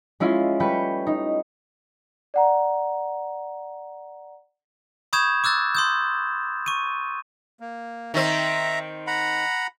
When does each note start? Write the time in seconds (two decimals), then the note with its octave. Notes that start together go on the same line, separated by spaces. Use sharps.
0.20 G#3 C#4 E4 F4
0.60 G3 A3 B4 C#6 G6
1.07 D#4
2.34 D5 F#5 A#5
5.13 B5 C#6 D#6 G6 G#6 E7
5.44 D6 E6 F#6 A6
5.75 C6 D#6 G6
6.66 C#6 D#7
7.60 A#3
8.14 D#3 C4 E5 A#5
9.07 F#5 A#5 B5